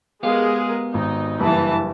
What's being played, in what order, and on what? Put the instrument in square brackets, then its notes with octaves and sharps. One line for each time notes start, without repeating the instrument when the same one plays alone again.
[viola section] G#3 G#4 A#4 [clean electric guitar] B3 G4 F5
[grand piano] G#1 [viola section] D#4
[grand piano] F#1 G2 [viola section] E3 A5